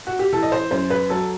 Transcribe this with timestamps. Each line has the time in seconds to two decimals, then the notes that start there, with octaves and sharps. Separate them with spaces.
0.07 F#4
0.19 G4
0.33 E3 A4
0.43 D#5
0.52 C5
0.71 F#2 C5
0.90 B4
1.10 F#3 A4